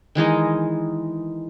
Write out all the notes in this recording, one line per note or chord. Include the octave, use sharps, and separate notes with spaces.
D#3 E3 G#3 D#4